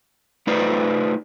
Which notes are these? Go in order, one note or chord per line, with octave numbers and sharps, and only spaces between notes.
A3 D#4 F4 B4 C5 D5